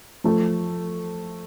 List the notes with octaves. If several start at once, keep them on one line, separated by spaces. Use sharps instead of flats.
F3 A3